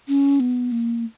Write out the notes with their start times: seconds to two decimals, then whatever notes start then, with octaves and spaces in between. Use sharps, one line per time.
0.08 C#4
0.40 B3
0.72 A#3